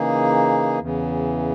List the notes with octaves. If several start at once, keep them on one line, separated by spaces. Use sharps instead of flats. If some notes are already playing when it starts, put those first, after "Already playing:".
Already playing: C#3 E3 A#3 D#4 G#4
E2 C#3 E3